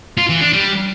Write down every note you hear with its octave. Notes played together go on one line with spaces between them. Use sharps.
F4
E3
D4
G3